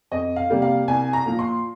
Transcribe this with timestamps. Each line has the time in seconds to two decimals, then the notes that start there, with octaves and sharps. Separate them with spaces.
0.11 F2 D#5
0.36 F5
0.50 C3 G3 A#3
0.62 F5
0.88 C2 G#5
1.13 A#5
1.26 A#2 F3
1.39 C6